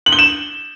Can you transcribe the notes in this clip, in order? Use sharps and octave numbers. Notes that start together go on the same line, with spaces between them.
F#7
G7
E7